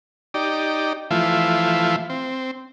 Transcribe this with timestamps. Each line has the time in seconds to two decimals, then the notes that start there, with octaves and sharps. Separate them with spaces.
0.34 D#4 G4 D5
1.11 E3 F3 A3 E4 F4
2.10 C4